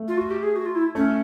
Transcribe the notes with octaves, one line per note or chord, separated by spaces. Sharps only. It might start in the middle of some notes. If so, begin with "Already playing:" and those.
Already playing: A3
F4
F#4
G4
G#4
F#4
F4
E4
A3 C#4